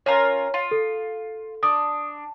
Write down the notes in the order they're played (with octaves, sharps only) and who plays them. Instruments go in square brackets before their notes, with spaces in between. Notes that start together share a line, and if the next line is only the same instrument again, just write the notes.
[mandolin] C#4 F4 A#4 [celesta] C#5
[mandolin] F4
[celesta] A4
[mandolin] D4 [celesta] D#6